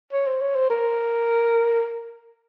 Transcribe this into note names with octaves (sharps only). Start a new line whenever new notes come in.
C#5
C5
C#5
C5
A#4